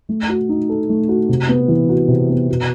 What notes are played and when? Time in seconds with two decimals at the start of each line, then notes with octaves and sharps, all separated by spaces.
0.09 A3
0.29 F#4
0.49 D#4
0.69 A4
0.89 A3
1.09 F#4
1.29 C3
1.49 B3
1.68 E3
1.89 F#4
2.08 C3
2.29 B3
2.48 B2